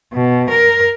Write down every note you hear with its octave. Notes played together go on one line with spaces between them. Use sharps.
B2
A#4